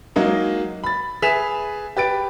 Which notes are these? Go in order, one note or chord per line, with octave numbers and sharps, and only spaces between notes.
F#3 G#3 A#3 D#4
B5 A6
G#4 B4 E5 B6 E7 F7
G4 B4 A6 D7